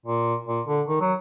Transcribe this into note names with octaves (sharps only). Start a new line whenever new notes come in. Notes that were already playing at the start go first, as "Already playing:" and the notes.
A#2
A#2
D3
D#3
F#3